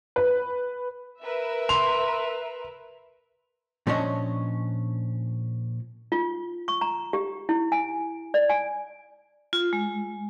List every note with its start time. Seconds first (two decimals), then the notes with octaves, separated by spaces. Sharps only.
0.16 B4
1.23 A#4 B4 E5
1.69 C6 F7
3.87 A#2 F3 C#4 D4 C#5 D#5
6.12 F4
6.68 C#6
6.81 A#5
7.13 G4
7.49 E4
7.72 G#5
8.34 D5
8.49 G#5
9.53 F4
9.73 G#3